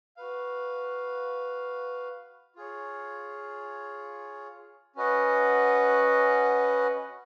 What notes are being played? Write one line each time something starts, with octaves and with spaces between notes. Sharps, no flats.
F#4 B4 F5
F4 G#4 C#5
C#4 F#4 B4 D#5 F#5